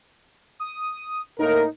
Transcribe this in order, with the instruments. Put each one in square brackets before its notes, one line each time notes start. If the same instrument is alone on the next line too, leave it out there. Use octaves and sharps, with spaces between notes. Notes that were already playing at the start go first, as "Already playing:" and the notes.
[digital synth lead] D#6
[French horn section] A2 A#3 A#4 [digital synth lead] D#4